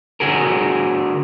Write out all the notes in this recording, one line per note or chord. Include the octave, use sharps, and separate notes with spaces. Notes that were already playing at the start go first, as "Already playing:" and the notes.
D3 F#4 G#4 A#4